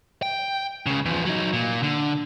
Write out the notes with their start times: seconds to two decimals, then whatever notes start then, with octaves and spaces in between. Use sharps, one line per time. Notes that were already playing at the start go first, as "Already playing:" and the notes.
0.22 G5
0.86 C#2 C#3
1.05 E2 F3
1.25 F#3 D#4
1.53 A#2
1.83 D3